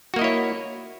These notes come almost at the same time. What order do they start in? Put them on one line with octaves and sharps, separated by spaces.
F#4 A#3 D#5 E4 C#5